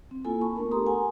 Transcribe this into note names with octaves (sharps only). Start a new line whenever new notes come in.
C4
A#3 E4 F4 A4 G#5
A5 B5 C#6
A3 B3 D4 A#4
G4 A4 A#4 A#5 C6 D#6
F#5 G#5